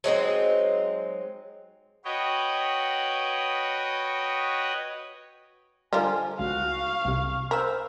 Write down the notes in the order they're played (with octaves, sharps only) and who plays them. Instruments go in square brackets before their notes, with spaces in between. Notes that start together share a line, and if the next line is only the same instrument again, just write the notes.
[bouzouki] F#3 G#3 C4 D#4
[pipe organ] F#4 B4 C#5 D#5 G5
[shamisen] D3 F3 A#4 [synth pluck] G3 F4 [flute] G#5
[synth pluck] C#2 [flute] F#4 [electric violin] F5
[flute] C#6
[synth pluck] C2 C3
[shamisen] A#4 [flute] C5 [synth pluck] B5 E6